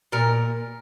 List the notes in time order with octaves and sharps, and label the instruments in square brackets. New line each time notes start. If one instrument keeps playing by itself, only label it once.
[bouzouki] A#2 A#4